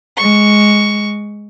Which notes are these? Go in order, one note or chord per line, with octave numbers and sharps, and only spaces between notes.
G#3 C#6